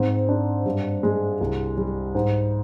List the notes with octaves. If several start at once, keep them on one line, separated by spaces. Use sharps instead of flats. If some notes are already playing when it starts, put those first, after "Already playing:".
Already playing: G#2 C4
D4
G2
G#3
C2
G3
G#2